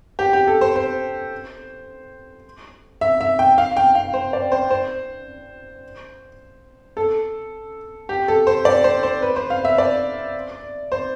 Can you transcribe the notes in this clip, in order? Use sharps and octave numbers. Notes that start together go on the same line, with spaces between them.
G4
G4
A4
C5
C5
E5
E5
G5
F5
G5
F5
C5
D5
C5
C5
A4
G4
A4
C5
D5
C5
C5
B4
C5
F5
E5
D5
C5